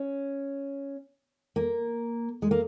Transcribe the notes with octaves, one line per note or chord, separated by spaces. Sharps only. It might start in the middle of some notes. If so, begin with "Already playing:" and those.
Already playing: C#4
A#3
G#3
A#3